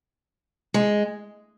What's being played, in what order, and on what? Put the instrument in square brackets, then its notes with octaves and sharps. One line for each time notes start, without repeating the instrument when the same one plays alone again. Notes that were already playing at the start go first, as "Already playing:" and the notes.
[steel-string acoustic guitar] G#3